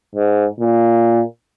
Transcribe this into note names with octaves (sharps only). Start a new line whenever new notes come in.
G#2
A#2